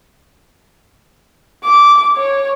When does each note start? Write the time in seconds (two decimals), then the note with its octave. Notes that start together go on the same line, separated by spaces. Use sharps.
1.64 D6
2.17 C#5